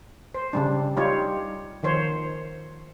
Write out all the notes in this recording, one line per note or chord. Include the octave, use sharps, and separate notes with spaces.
C5
C#3 G3 D4
G3 D#4 F4 G4 C#5
D#3 F3 C5 C#5